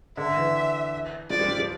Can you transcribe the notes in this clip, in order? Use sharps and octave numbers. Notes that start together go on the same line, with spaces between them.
D3 E5
E3
F3 D5
G3
F3
G3